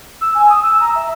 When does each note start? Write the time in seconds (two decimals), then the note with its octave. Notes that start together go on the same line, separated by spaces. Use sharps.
0.21 E6
0.35 G#5
0.50 D#6
0.63 E6
0.80 A#5
0.95 E5